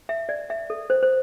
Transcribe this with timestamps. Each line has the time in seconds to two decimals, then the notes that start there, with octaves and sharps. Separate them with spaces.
0.09 E5
0.29 D5
0.50 E5
0.70 A4
0.90 C5
1.03 C5